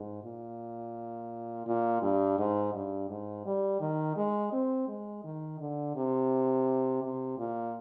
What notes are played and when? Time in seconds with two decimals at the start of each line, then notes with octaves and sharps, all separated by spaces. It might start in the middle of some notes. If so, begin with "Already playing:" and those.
Already playing: G#2
0.24 A#2
1.67 A#2
2.02 G2
2.38 G#2
2.74 G2
3.09 G#2
3.46 G3
3.81 D#3
4.17 G#3
4.53 C4
4.88 G#3
5.24 D#3
5.59 D3
5.95 C3
7.02 C3
7.38 A#2